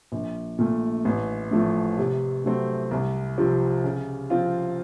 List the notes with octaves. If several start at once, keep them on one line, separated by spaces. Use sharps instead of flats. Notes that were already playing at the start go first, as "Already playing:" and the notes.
A#1
A#2 A3
A1
A2 F3 A3
C3
F#3 A3 C4
C2
C3 F3 C4
C#3
F3 C4 F4